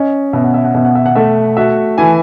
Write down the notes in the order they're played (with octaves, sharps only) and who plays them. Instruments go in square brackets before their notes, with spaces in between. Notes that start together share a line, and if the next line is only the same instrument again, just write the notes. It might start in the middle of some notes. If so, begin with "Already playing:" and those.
Already playing: [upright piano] C#4 [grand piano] D#5
[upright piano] B2 [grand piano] E5
[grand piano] F#5
E5
F#5
[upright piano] B2 [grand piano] E5
[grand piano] F#5
E5
F#5
[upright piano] A3 [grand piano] E5
[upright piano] F#4 [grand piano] E5
[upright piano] E3 [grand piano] G#5